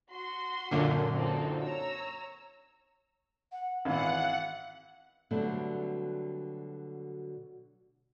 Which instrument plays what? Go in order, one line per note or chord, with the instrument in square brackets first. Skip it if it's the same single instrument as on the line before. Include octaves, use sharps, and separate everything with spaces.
[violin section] F#4 C6
[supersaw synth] F#2 A#2 D3
[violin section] C4 D#4 A4
C#5 A#5 E6
[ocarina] F#5
[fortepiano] G#1 E3 [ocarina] F5 [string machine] F#5
[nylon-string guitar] B2 D3 F#3 G3 A3 C4